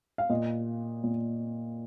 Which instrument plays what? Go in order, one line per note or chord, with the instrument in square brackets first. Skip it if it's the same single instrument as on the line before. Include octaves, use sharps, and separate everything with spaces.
[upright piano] F5
A#2 D#5
A#2